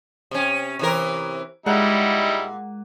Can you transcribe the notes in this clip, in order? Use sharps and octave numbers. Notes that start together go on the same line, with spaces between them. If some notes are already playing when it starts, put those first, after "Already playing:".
C3 C#4
C3 E3 A#4
A#2 G3 G#3 D#4 E4 F#5